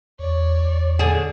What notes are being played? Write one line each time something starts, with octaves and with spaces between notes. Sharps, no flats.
E2 C#5 D5
E2
D3 G#4